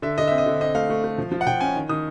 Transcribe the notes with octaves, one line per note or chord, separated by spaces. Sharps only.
D3 E5
D3 D#5
C4 E5
D#5
D3
C4 D#5
A3 F5
A3
A3
F3
F3
F#5
F3 G5
C#4 G#5
D#3
D#3 D#6